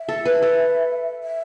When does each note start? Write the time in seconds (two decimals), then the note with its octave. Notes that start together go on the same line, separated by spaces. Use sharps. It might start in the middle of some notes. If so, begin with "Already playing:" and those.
Already playing: E5
0.09 A4
0.25 B4
0.42 A4
1.23 E5